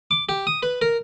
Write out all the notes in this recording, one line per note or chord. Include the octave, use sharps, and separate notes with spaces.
D6
G4
D#6
B4
A#4